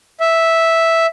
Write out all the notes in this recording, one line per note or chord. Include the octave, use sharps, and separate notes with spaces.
E5